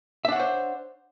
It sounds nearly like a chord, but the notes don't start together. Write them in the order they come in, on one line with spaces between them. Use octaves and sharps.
E5 D4 F#5 C#5 C5